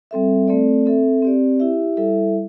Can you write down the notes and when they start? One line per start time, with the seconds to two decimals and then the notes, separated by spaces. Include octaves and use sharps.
0.11 G3 C4 A4 E5
0.48 A3 C4 A4 D5
0.86 C4 A4 E5
1.22 C4 G4 D5
1.60 E4 G4 E5
1.97 G3 E4 A4 E5